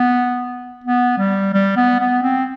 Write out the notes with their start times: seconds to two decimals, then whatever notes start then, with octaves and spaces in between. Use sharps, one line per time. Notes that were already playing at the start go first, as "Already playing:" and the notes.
Already playing: B3
0.84 B3
1.18 G3
1.54 G3
1.76 B3
2.00 B3
2.23 C4